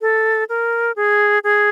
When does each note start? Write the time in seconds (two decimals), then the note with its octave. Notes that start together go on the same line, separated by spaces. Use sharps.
0.01 A4
0.49 A#4
0.96 G#4
1.44 G#4